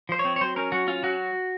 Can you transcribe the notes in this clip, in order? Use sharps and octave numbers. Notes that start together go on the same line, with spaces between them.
F3 C5
C#5
C4
C#5
F#3 C5
C#4 A#4
F#3 F#4
C#4 F4
F#3 F#4